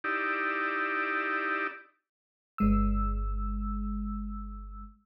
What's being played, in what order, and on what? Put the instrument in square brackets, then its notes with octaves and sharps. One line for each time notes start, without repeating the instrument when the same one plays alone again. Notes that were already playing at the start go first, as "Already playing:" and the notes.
[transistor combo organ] D#4 E4 G4 D5
[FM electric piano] G1 G#3 E6